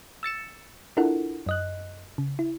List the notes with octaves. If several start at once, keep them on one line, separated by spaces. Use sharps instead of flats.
E6 A6 C#7 E7
D4 E4 F4 A4 A#4 F#5
F#2 D#5 F#6
C#3
E4